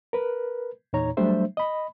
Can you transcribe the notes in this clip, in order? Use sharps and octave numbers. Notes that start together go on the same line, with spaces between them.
A#4 B4
E2 A#2 D#4 C#5 A#5
F#3 G3 A3 D4 C5 E5
D#5 B5